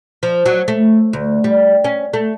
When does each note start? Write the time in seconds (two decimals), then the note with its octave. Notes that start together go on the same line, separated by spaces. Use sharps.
0.23 F3
0.46 F#3
0.68 A3
1.13 D2
1.44 G3
1.84 C#4
2.13 A3